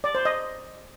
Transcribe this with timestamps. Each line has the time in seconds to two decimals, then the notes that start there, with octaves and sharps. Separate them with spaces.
0.04 D5
0.15 C5
0.25 D#5